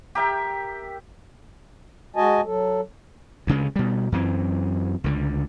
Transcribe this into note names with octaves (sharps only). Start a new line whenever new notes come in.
G4 A#4 E5 G5
G#3 F#4 D#5 G#5 A5
F#3 A4
D2 C#3 G#3
B2 G3
F#2 E3 C4
C#2 D3